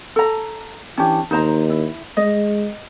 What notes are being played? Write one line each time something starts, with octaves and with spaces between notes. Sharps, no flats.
A4 A#5
E3 C#4 D4 G4
D#2 D#4 C5 A#5
E4
G#3 D#5